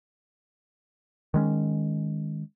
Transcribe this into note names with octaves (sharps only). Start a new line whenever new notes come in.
D#3 G#3 C#4